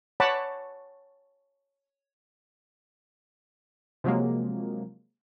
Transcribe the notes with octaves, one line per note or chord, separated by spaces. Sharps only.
C#5 F#5 A5 B5 D6
C3 F3 F#3 G#3 A#3